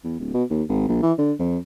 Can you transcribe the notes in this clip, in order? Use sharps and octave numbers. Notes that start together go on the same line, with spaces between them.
E2
D1
B2
D#2
G#1
A#1
E3
D3
F2